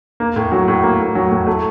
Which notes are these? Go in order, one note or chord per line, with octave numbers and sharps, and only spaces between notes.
A#3
A2
F#3
A2
A#3
A2
F#3
A2
A3